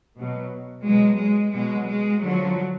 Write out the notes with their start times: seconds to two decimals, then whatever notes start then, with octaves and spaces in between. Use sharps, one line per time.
0.17 B2 F#3
0.85 B2 F#3 G#3
1.20 G#3
1.54 B2 F#3 G#3
1.88 G#3
2.22 D3 F3 F#3